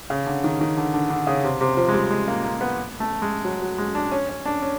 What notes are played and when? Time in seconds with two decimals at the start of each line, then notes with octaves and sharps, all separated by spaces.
0.10 C#3
0.27 D3
0.44 D#3
0.61 D#3
0.77 D3
0.94 D3
1.10 D3
1.27 C#3
1.44 C3
1.61 C3
1.77 F3
1.88 G#3
1.94 G3
2.11 G#3
2.28 A#3
2.44 A#3
2.61 B3
3.00 A3
3.22 G#3
3.45 F#3
3.62 F#3
3.78 G#3
3.95 D4
4.12 C#4
4.29 C#4
4.45 D4
4.62 C#4